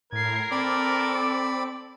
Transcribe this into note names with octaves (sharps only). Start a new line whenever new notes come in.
A2 A#4 G#6 C7
C4 A4 D5 B5 D6